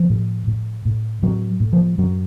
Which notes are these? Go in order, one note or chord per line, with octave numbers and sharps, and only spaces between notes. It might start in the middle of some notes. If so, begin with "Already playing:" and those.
Already playing: F3
A2
A2
A2
A2 F#3
A2
F3
F#2 F#3